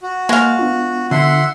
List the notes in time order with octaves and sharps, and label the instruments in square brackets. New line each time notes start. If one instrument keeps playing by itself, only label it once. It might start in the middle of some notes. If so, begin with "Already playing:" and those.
[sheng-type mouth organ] F#4
[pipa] G#3 F5 [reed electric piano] A#3 C#6
[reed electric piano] B3 D4 F4
[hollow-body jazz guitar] D3 [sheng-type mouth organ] E5 F#5 C6